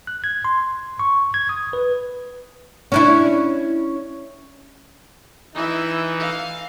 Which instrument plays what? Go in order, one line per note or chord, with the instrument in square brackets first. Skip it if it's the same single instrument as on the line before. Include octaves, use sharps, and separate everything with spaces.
[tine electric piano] F#6
G#6
C6
C#6
G#6
D#6
B4
[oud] C#4 D4 E4
[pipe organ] E3 D#4 [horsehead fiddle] E4 E5
[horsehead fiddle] F5